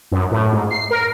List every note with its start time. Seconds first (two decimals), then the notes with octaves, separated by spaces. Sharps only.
0.12 F#2
0.31 A2
0.53 G#2
0.71 C7
0.91 A#4